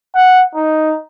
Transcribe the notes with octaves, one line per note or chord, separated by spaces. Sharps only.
F#5
D#4